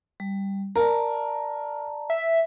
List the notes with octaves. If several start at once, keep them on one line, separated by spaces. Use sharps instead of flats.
G3
A#4 D5 A5 A#5
E5